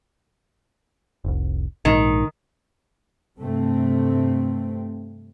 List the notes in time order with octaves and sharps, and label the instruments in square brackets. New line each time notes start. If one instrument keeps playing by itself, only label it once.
[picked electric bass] F1 C2
[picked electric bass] A#1 G#2 [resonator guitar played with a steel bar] D#3
[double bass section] G2 C3 A3 C4